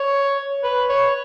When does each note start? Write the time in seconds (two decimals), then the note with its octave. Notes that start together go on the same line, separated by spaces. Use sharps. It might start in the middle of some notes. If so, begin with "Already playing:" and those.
Already playing: C#5
0.63 B4
0.89 C#5